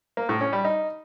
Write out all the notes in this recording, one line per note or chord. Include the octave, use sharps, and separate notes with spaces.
A#3
A2
C#4
G3
D#4